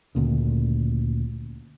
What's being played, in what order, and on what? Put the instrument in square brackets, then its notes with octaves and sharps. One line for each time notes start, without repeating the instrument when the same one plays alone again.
[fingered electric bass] D2 A#2 C#3